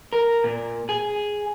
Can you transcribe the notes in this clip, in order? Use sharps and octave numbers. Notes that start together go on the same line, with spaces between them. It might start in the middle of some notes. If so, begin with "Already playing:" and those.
A#4
A#2
G#4